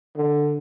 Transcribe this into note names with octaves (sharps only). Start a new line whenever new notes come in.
D3